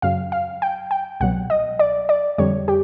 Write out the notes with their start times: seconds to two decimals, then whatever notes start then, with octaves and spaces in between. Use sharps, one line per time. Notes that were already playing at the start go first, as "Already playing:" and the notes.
0.02 F#2 C#3 F#3 F5
0.32 F5
0.62 G5
0.91 G5
1.20 C2 B2 F#3 F#5
1.50 D#5
1.79 D5
2.09 D5
2.38 F2 D3 G3 C#5
2.68 G4